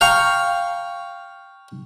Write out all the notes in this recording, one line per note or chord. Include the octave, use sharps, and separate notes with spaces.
F5 G5 A#5 C#6